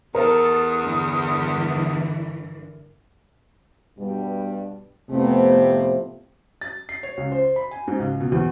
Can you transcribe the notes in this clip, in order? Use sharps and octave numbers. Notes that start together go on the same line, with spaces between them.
E2 A4 A#4 D#6
G2 D3 E3
G2 B2 G3
F2 A2 C3 A3 B3
A6
C7
C#5
C#2
C5
B5
G#5
G#2
C#2
B2
E2